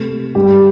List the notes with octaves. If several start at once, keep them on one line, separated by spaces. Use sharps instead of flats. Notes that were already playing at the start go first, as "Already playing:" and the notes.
Already playing: C3 A3
G2 G3 G4